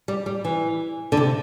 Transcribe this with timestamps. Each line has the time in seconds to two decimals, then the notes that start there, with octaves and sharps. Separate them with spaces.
0.08 G3
0.26 G3
0.45 E3
1.12 D3
1.17 C3